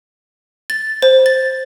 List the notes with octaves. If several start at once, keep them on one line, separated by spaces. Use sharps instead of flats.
A6
C5
A6